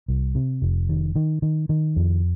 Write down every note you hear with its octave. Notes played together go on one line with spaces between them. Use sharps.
C2
C3
F1
D#3
D#3
D#3
D#3
F2